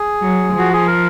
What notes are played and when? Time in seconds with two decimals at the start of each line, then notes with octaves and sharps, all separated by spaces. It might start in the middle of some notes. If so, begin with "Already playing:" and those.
Already playing: G#4
0.22 F#3
0.54 F3 F#4
0.73 G#4
0.87 A#4